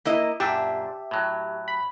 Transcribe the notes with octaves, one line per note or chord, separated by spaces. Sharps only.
A#3 E4 D#5
F#2 A#2 D4 G4 E5 A5
A2 F#3
B5